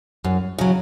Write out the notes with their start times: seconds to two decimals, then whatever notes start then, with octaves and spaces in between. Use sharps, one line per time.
0.24 F#2
0.59 C#3 F#3